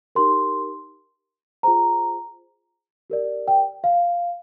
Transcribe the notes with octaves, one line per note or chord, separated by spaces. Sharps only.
D#4 G4 A#4 C6
F4 G#4 C5 A#5
G4 A#4 D5
G5
F5